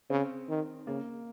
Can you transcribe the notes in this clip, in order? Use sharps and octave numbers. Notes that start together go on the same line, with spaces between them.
C#3 C4
D#3
C#3 A#3